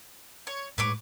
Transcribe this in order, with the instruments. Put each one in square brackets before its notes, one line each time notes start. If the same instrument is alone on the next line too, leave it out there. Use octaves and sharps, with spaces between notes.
[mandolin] C#5
[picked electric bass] A2 G#3 [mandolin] B4 C#5 D6